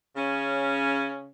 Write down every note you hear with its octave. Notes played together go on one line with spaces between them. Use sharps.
C#3 C#4